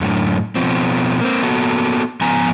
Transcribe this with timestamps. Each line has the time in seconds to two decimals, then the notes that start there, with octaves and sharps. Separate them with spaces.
0.01 F#2 A2 D3
0.56 B2 F3 C4
1.21 A#3 C4
1.43 A#3 B3 F#4 A4
2.21 G#2 F3 B3 G#5 A#5